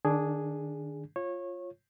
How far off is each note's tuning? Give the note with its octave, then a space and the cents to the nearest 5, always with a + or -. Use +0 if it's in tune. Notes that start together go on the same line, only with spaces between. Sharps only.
D#3 -40 D4 -10 G#4 +0
F4 +0 C#5 -25